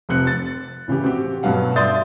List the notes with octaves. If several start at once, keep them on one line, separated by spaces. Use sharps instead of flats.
F1 C3 F#6 C#7
A6
A2 C#3 E3 G4
C4 F#4 G4
G2 B2 F#3 F5 F#5
D5 E5 C6 D#6 G6 A6